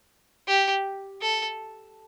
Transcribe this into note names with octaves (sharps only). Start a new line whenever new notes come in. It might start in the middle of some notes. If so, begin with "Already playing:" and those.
G4
A4